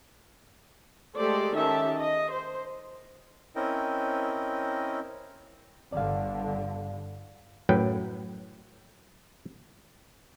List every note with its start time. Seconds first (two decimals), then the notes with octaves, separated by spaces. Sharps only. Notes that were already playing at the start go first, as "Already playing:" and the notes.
1.16 G#3 A3 G4 A4 C5 D5
1.55 D#3 C#4 G4 E5 A5
1.99 D#5
2.32 C5
3.56 C4 C#4 E4 A#4 D#5 G5
5.93 G1 G2 D3 D5 F5
7.69 F#2 A2 F#3 B4 G5